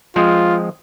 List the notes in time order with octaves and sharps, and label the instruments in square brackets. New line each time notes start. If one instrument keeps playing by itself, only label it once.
[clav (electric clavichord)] F3 G#3 C4 [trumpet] F4